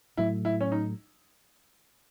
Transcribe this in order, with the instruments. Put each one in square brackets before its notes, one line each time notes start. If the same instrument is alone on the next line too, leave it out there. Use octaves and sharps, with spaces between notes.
[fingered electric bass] A2 F#3 A3 [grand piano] E4
[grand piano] E4
C#4
D#4